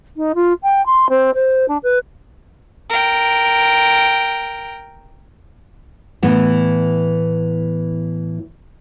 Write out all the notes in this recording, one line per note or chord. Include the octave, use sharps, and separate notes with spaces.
D#4
F4
G5
C6
C4
C5
D4
B4
A#4 G5
A2 E3 B3